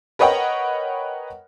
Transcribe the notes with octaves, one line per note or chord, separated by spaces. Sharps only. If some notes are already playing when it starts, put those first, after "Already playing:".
A#4 B4 C#5 D#5 F#5 G5